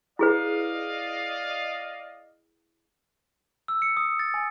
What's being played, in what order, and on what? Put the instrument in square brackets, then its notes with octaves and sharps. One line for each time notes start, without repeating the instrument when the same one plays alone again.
[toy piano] E4 G#4 B4 [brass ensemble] D5 D#5 F5
[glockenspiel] E6
C#7
D#6
A6
G#5